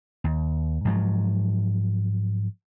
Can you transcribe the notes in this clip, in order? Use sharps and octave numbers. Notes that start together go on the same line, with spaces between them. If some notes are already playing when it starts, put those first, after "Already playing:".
D#2
G#2 F3 F#3